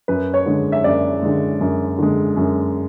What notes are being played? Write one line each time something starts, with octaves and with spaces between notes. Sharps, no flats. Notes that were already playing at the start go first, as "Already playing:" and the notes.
F#2 B4
C#5
D3 G#3
E5
F#2 D5
D3 G#3
F#2
D3 G#3
F#2